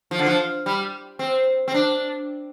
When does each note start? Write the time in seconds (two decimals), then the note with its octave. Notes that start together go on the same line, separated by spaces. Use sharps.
0.11 F3
0.19 D3
0.26 F3
0.66 G3
1.19 C4
1.68 C4
1.74 D4